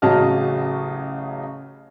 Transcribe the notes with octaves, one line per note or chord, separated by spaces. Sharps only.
A1 C#3 F#3 D#5 A5 F6